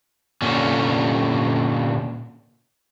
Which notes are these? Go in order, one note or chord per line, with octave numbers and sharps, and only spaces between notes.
A#2 D3 C#4